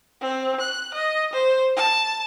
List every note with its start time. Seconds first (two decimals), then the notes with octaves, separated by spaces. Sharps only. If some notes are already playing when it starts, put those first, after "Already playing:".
0.21 C4
0.61 F#6
0.94 D#5
1.33 C5
1.76 A5